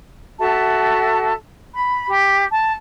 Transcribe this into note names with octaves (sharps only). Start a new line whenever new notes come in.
F#4 A4 E5 A5
B5
G4
A5